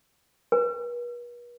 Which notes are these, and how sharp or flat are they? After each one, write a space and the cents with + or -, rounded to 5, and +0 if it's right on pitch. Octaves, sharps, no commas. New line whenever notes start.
B4 -45